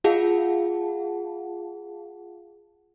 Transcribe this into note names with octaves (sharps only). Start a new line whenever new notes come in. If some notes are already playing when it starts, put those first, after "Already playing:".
F4 G#4 F5 F#5 A5